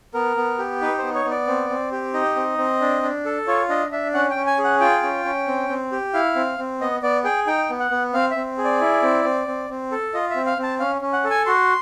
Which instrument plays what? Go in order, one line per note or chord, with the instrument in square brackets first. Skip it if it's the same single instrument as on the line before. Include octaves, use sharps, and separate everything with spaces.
[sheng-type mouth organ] B3 A#4
B3
G4
D#4 B4
B3 C5
C#5
B3
D5
C4
C4
G4
D#4 D#5
C4
C4
D4
D4
A4
F4 C#5
D4 D#5
D4 E5
C#4 F#5
G5
C#4
G#5
G#4
F#5
F4 G5
C#4
C#4
C4
C4
G4
E4 F5
C4
C4
B3 D#5
B3 D5
G#4 G5
D#4 G5
B3
F#5
B3
C4 F5
C4 E5
G#4
D5
E4
C4
C4
C4
C4
A4
F4 D#5
C4 E5
F5
C4
A5
C#4 F5
C#4
F#5
A4
G#5
F#4 C6